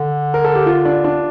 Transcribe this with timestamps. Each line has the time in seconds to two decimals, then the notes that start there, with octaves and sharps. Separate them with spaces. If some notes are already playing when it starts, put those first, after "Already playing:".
Already playing: D3
0.34 A#4
0.44 A4
0.55 G4
0.66 F4
0.85 D4
1.04 D4